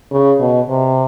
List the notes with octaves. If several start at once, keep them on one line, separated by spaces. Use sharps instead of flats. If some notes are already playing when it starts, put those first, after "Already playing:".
C#3
B2
C3